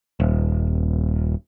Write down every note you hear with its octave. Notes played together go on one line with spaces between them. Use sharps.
D#1